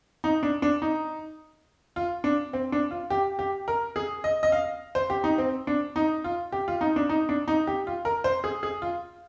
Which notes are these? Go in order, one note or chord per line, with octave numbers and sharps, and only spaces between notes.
D#4
D4
D4
D#4
F4
D4
C4
D4
F4
G4
G4
A#4
G#4
D#5
D#5
F5
C5
G4
D#4
C4
D4
D#4
F4
G4
F4
D#4
D4
D#4
D4
D#4
G4
F4
A#4
C5
G#4
G#4
F4